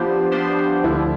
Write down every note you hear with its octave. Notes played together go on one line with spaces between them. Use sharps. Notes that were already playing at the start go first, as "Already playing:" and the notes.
Already playing: F3 B3 D4 F4 G4 C5
F3 B3 D4 G4 C5
D2 D3 F3 E4